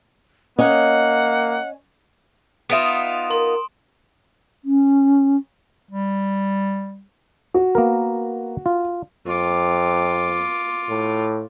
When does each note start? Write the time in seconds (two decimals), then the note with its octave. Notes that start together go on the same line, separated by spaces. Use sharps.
0.59 A#3 C#4 C#5 D#5 F#5
2.70 B3 D#4 F4 B4 E5 D#6 D7 E7
3.31 A#4 C6
4.65 C#4
5.91 G3
7.54 F#4
7.75 A#3 B3 A#4
8.66 F4
9.27 F2 F4 D6
10.89 A2